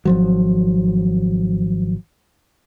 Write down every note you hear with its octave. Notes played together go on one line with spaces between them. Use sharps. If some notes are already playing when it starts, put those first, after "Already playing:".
G#1 F3 F#3